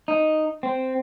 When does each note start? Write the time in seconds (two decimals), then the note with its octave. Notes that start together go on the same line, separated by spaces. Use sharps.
0.08 D#4
0.63 C4